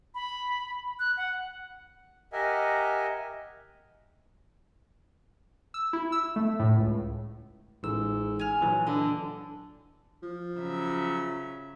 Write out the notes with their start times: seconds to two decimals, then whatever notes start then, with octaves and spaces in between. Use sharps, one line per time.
0.15 B5
0.99 F#6
1.17 F#5
2.33 G4 A#4 D#5 E5 F#5 G#5
5.74 E6
5.93 E4
6.12 E6
6.36 A3
6.60 A2
6.77 C#2
7.83 A1 G#2 E6
8.39 G#5 F6
8.61 A#2 E3 F#3
8.87 D3 D#5
10.23 F3
10.57 C#3 F#3 E5